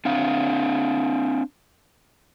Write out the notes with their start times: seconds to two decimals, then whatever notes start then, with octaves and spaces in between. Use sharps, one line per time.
0.05 C4 D4 F5